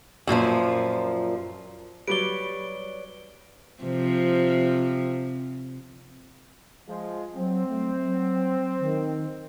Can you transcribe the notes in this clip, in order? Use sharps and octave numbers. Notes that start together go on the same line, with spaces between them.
F#2 A#2 D#3 F3
F#3 G3 B4 C#5 D5 D7 G7
C3 F3
F3 G#3
F#3 C4
A3
F#3
D#3